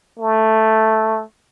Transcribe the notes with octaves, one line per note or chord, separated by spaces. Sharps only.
A3